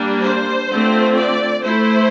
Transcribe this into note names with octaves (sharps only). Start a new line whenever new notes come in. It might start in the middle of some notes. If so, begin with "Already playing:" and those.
Already playing: G3 A#3 D4
C5
D3 A3 C4 F4
D5
A3 E4 C5